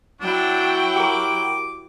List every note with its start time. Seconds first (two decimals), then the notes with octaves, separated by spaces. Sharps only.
0.21 F#3 D4 E4 F#4 G5
0.96 G4 A#4 D6